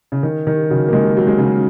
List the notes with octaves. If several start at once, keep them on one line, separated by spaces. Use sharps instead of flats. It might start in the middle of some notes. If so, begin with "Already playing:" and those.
C#3
D#3
D#3
C#3 F#3
A#3
D#3 G#3
F#3
G#3
C#3 F#3